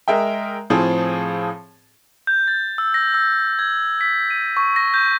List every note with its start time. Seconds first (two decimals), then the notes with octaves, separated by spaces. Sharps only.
0.08 G#3 A#4 E5 G5
0.70 A2 F3 C4 G#4 A5
2.27 G6
2.48 A6
2.78 E6
2.94 A#6
3.14 E6
3.59 G#6
4.01 B6
4.30 D#7
4.57 C#6
4.76 A#6
4.94 G6